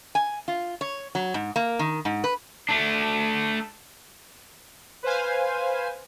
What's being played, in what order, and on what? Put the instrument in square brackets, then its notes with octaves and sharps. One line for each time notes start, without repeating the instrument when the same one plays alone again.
[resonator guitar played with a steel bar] G#5
F4
C#5
F#3
G#2
A#3
D#3
G#2
B4
[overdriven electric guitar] A3 D4
[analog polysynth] B4 C5 F5 G#5